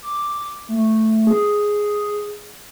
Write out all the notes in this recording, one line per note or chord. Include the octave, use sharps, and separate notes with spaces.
D6
A3
G#4